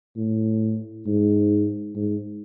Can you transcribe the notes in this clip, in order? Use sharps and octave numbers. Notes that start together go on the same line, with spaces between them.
A2
G#2
G#2